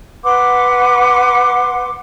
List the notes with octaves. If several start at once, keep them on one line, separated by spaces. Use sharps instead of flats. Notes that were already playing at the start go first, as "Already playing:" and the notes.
B4 F#5 C6 D6